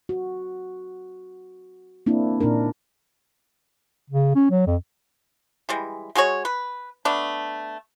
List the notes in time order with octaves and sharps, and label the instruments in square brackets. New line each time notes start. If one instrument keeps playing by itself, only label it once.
[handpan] F#4
A#3 C4 D4 E4
A#2 D4 D#4 A#4
[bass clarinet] C#3
C#4
F#3
F2
[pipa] E3 G3 G#3
G#3 F#4 G#4 C#5
B4
A3 B3 D4